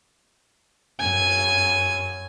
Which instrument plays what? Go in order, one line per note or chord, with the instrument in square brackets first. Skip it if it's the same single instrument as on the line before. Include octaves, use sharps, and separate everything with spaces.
[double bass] F#2 [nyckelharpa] G#5